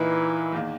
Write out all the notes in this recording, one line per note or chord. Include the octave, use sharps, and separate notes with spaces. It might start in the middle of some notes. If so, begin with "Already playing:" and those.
Already playing: A#2 E3 A#3 D#4 A#4
E2 D#3 A#3